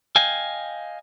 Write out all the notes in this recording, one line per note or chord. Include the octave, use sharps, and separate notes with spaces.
D#5 F5 G5 G#5